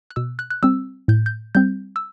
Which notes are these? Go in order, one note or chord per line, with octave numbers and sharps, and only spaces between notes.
F#6
B2 E6
F#6
F#6
G3 C4 E6
A2 G6
G6
G3 C4 G6
E6